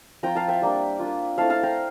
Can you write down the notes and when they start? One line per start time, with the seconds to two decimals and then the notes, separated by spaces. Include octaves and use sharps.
0.23 F3 C4 F4 G5 A#5
0.35 F5 A5
0.48 E5 G5
0.62 G3 A#3 D4
0.99 A#3 D4 F4
1.37 A3 C4 E4 F5 A5
1.50 F5 A5
1.63 G5 A#5